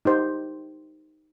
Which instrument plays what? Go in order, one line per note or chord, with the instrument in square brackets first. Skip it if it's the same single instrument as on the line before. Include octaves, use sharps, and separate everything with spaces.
[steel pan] D#4 G4 C5